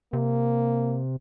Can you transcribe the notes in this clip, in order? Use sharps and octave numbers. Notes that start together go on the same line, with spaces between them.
C3 A#3